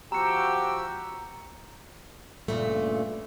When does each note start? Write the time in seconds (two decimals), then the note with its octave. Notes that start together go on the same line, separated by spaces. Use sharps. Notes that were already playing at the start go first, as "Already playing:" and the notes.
0.12 F3 F#4 G4 A#5 E6 C#7
2.48 G2 A#2 C#3 A3